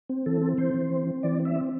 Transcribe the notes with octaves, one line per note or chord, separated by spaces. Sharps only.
C4
E3 A4
C4
E3 C5
E3
C4
C4
E3 D5
C4
E5
C4